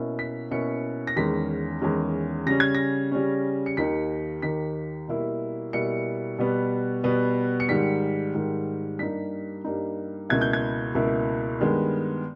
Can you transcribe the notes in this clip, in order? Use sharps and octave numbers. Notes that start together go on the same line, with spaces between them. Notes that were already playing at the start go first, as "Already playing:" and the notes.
Already playing: B2 A#3 C#4 E4
B6
B2 A#3 C#4 E4 C#7
A#6
E2 D#3 G#3 C#4 B6
E2 D#3 G#3 C#4
C#3 G3 C#4 A#6
G#6
A#6
C#3 G3 C#4
C#7
D#2 D#3 A#3 D#4 B6
D#2 D#3 A#3 D#4 B6
B2 G3 A#3 E4
B2 G3 A#3 E4 C#7
B2 G3 B3
B2 G3 B3
C#7
G#2 D#3 G3 B6
G#2 D#3 G3
G2 G3 A#3 D#4 B6
G2 G3 A#3 D#4
C#2 B2 A#3 E4 G#6
G6
G#6
C#2 B2 A#3 E4
G2 D#3 G#3 B3